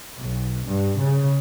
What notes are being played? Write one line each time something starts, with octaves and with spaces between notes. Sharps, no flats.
B1
G2
C#3